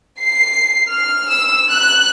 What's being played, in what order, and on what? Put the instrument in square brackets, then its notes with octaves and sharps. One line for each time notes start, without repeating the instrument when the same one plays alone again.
[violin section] C7
F6
E6
F#6